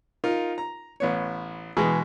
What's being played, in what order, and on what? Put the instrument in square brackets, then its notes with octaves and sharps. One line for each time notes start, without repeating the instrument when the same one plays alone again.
[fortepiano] D#4 F4 A#4
A#5
A1 B3 C#5
[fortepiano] B2 G#3 [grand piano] E3 G#4